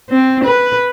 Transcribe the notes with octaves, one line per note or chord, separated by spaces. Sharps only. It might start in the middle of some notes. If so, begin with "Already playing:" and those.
C4
B4